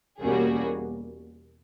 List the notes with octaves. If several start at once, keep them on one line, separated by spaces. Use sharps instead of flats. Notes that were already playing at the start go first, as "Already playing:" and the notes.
E2 B2 G3 A#3 C#4 F#4 G#4